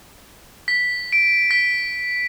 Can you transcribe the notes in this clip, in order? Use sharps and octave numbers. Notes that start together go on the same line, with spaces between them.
B6
D7
B6